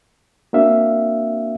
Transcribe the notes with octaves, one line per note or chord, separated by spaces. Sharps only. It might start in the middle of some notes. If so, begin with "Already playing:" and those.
A#3 C4 D4 F#4 E5 F5